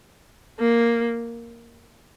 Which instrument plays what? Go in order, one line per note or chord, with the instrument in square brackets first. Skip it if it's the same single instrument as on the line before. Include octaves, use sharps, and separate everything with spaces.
[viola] A#3